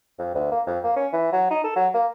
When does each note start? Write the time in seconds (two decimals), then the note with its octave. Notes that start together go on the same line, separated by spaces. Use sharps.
0.19 F2
0.35 D2
0.52 A#3
0.67 F2
0.84 A#3
0.96 C#4
1.13 E3
1.32 F#3
1.51 D#4
1.64 A4
1.76 F#3
1.94 A#3